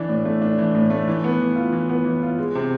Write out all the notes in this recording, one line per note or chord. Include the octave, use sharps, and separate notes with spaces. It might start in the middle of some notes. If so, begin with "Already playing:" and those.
Already playing: E3 D4
A2
A3
D4
E3
A2
A3
E3
B3
E3
F4
E3
B3
E3
F4
G#3
C3